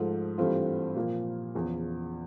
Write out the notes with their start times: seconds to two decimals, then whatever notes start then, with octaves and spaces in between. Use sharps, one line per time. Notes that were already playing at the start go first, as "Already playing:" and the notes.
Already playing: G#2 F3 A3
0.38 G2 E3 A3 C4 F4
0.96 A#2 F3 A#3
1.55 E2 C#3 F3